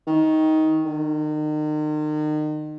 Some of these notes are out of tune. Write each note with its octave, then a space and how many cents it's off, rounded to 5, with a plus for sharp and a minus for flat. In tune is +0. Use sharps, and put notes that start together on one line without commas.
D#3 +15
D#3 -35